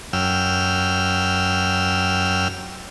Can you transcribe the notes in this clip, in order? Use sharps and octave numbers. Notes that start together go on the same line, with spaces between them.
F#2 G5 E6 F6